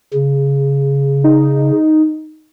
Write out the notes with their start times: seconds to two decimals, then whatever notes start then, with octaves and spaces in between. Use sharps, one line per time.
0.14 C#3
1.24 D#4